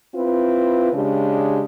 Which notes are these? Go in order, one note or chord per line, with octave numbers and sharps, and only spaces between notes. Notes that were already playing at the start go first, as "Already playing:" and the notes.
C4 E4 F4 B4
C#3 G#3 D4 G4